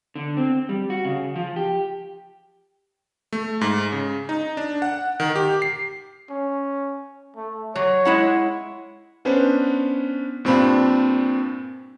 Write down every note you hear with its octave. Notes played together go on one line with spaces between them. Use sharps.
D3
C4
G3
F#4
C#3
F3
G4
A3
G#2
C#3
D#4
D4
F#5
D#3
G4
C7
C#4
A3
F#3 C#5
G#3 E4 F#5
B3 C#4 D4 B4 C5
G2 A#2 C4 D4 B5